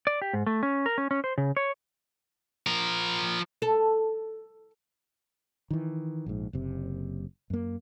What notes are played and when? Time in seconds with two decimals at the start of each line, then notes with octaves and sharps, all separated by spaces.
0.07 D5
0.22 G4
0.33 G#2
0.47 A3
0.63 C#4
0.86 A#4
0.98 C#4
1.11 C#4
1.24 C5
1.38 C#3
1.57 C#5
2.67 F3 A#4
3.62 A4
5.71 D#3 E3
6.26 A#1 G#2
6.53 F#1 C3
7.50 F#2 A#3